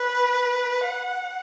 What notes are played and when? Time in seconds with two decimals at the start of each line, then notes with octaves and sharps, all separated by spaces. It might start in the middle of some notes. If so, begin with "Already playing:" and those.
Already playing: B4
0.84 F#5